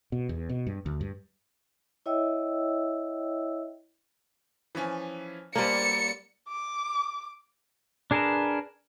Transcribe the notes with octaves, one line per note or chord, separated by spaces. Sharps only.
B2
E2
B2
G2
D2
G2
E4 C#5 D#5 E5 G5 E6
E3 F3 C#4
G3 A#3 A4 C5 D5 C#7
D6
D4 G#4 A#4 B4 A5